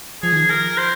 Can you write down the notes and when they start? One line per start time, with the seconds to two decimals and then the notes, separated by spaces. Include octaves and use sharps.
0.22 F3 G#4
0.32 D#3
0.43 F3
0.50 A#4
0.77 C5